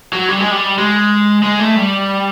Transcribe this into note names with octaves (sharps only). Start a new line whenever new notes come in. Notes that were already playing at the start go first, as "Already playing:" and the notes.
F#3
G3
G#3
G3
G#3
G#3
A3
G3